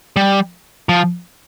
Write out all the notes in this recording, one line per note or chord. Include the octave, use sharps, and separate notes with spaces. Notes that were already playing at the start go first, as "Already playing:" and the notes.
G3
F3